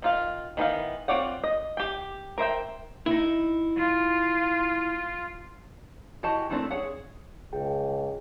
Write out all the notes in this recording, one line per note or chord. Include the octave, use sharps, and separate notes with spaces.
D#3 F4 F5
D#3 E3 B3 F5
C4 F4 C#5 D5 F#5
D#5
G4 G5
A#4 C5 E5 G5
D#4 E4
F4
E3 F#4 G4 D#5 A5
D#3 E3 A3 C4 D4
G#4 C#5 F#5
C#2 G#4 G5